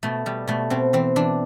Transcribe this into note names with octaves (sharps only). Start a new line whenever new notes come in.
B2 A3
B2 G3
B2 A3
B2 C4
E3 C4
E3 D4